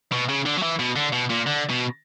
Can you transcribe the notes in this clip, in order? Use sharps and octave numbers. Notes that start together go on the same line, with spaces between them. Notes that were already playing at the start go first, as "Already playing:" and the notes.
B2
C#3
D3
F#3
E3
B2
D3
B2
A#2
D3
B2